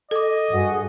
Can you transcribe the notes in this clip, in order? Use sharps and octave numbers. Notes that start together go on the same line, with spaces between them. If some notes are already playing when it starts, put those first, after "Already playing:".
A4 D#5 D6
G2 F#4 G#4 F#5